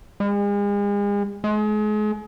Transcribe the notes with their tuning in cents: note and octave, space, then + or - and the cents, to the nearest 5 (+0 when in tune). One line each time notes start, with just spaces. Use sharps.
G#3 -40
G#3 +35